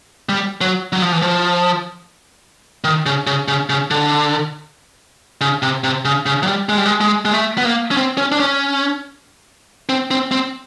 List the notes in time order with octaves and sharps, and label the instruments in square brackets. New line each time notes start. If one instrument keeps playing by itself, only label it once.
[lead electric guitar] G3
F#3
F#3
F3
E3
F3
D#3
C#3
C#3
C#3
C#3
D3
C#3
C3
C3
C#3
C#3
F#3
G3
G#3
G3
G#3
G#3
G#3
A3
B3
A#3
C#4
C4
C#4
D4
C#4
C4
C4
C4